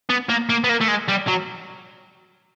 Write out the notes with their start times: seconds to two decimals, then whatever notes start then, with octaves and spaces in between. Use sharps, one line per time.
0.10 B3
0.29 A#3
0.49 A#3
0.64 B3
0.69 A#3
0.81 A3
0.88 G#3
1.08 G3
1.27 F#3